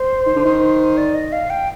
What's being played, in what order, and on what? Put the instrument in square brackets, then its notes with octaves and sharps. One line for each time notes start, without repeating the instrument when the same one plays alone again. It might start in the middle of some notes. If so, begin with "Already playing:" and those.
Already playing: [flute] C5
[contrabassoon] D#3
D3
D#3
[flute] D5
D#5
F5
G5